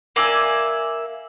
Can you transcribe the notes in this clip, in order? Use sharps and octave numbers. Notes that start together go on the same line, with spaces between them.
A#3 D5 E5 G#5